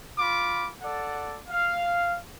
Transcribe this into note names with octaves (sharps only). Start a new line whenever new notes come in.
F4 B5 D6
A4 D5 F#5
F5